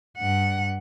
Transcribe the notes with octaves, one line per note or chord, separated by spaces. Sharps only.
G2 F#5